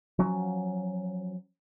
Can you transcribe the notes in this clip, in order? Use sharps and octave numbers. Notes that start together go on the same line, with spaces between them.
F3 F#3 C#4